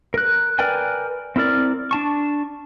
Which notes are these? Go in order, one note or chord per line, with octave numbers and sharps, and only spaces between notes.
A#4 F#6
A#4 B4 D5 G5 G#5
C4 E4 A#4 D5
D4 A5 C#6